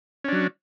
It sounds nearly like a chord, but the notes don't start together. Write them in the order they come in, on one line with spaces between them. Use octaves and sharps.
C#4 D4 F#3